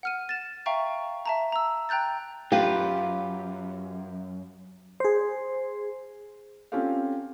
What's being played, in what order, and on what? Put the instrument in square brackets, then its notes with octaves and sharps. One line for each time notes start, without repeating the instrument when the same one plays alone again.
[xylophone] F#5 F6 D#7
A6 E7
E5 F5 G5 A#5 C#6
E5 A5 A#5
A#5 E6
G5 A#5 F#6 G6 A6
[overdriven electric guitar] F#2 [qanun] F4 B4 [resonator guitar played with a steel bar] G4 [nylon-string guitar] F5
[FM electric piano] G#4 C5
[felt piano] C4 C#4 F4 G4 A4 F5